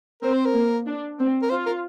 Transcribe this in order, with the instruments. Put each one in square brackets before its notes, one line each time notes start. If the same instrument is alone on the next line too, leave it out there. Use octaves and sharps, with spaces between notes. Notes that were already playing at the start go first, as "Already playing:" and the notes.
[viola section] C4 [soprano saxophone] A#4
[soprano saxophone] C5
A#4
[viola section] A#3
D4
C4
[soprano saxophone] A#4
[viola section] F4 [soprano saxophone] C5
[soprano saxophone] A#4